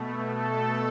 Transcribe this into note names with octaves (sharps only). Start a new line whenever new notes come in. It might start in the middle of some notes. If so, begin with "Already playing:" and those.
Already playing: B2 A3
A4